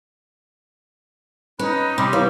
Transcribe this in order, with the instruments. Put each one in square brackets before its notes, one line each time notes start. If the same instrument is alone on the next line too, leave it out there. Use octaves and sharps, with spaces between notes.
[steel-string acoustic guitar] C#4 [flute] D#4 [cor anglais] B4
[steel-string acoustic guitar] C3 [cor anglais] G3 [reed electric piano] B5 C6 D6
[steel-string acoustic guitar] E3 [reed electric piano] C#5 F5